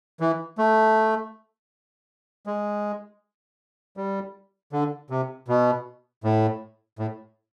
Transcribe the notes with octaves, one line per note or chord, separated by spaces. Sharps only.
E3
A3
G#3
G3
D3
C3
B2
A2
A2